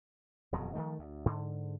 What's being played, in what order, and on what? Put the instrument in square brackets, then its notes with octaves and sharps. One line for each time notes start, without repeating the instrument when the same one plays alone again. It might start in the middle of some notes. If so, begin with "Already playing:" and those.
[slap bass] D#1 F2 B2 F#3
D#3 F3 A3
D2
G#2 D3